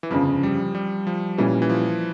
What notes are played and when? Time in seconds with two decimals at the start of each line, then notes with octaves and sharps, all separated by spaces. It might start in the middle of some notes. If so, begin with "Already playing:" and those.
0.03 E3
0.11 G1 F2 C#3 F3
0.43 G3
0.75 G3
1.07 F3
1.38 A#2 E3 G3 A#3 C#4
1.62 E3
1.69 F3